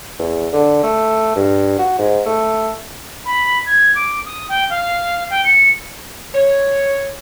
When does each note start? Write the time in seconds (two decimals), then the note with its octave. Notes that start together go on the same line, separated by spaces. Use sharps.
0.19 E2
0.53 D3
0.83 A3
1.36 G2
1.79 F#4
1.99 G#2
2.26 A3
3.25 B5
3.66 G#6
3.95 D6
4.25 D#6
4.48 G5
4.69 F5
5.30 G5
5.44 C#7
6.34 C#5